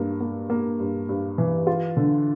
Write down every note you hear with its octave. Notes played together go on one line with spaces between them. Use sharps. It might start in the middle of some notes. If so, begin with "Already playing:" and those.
Already playing: G2 A#3
A#3
A#3
G2
G2
E3
F4
D3